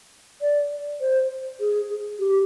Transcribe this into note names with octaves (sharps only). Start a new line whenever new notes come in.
D5
C5
G#4
G4